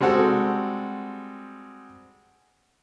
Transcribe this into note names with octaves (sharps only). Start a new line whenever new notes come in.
G3 G#3 C4 F#4 A4